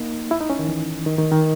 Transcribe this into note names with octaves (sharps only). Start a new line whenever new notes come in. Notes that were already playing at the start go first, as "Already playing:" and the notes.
Already playing: A#3 D#4
E4
D#4
C#4
D#3
E3
D#3
D#3
D#3